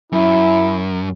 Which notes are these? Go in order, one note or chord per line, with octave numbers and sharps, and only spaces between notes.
F#2 E4